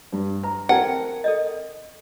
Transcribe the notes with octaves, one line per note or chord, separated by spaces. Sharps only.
G2
B4 A#5
C4 A#4 F#5 G5 A5 G#6
A4 D5 D#5